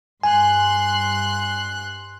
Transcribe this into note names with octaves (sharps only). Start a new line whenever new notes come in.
G2 G#5 C6 F#6